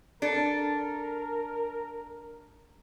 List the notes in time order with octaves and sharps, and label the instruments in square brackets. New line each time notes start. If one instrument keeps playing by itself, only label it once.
[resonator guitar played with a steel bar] D4 A4 [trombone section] A#4